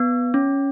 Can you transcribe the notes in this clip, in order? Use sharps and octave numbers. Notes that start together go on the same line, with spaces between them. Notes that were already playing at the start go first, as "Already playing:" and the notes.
Already playing: B3
C#4